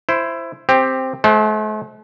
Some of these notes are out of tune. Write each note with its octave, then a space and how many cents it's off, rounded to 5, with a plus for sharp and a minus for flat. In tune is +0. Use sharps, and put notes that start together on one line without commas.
E4 +15 C5 +0
C4 +0 G4 +10
A3 -45 C5 +5 F#5 -30